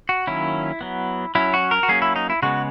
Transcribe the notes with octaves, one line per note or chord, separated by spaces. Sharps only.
F#4
D#3 F#3 A#3 C#4 E4
F#3 B3
F#3 C#4 E4
F#4
A#4
F#4
F#3 A#3 C#4 G#4
E4
D#4
E4
C#3 G#3 B3 F#4